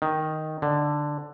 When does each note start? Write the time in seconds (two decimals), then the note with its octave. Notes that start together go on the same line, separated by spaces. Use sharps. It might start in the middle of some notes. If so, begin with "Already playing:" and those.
0.02 D#3
0.62 D3